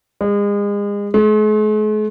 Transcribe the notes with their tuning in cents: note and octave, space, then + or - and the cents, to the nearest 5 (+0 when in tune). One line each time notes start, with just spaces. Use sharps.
G#3 -35
G#3 +45